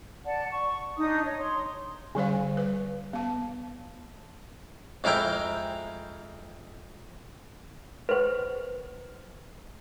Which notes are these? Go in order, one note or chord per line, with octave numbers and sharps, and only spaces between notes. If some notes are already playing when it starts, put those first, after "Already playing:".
D5 F#5 A5
C#6
D4 D#4 D#6
C#5
C#5 C6
D3 G3 C5 F5
B4
B3 A5
F2 G#3 E4 A#4 G5
B4 C5